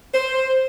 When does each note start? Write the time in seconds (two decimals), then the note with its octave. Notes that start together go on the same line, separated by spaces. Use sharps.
0.14 C5